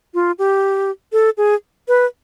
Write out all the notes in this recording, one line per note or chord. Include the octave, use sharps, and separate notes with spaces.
F4
G4
A4
G#4
B4